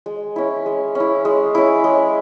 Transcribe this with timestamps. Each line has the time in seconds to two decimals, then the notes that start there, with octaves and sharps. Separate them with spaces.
0.06 G#3
0.36 C#4 E4
0.66 G#3
0.95 C#4 E4
1.25 G#3
1.55 C#4 E4
1.84 G#3